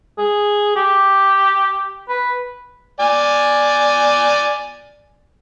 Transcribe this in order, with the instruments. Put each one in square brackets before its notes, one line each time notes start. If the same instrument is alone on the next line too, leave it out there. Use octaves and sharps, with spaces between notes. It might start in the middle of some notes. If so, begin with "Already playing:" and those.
[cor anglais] G#4
G4
B4
[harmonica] D5 G#5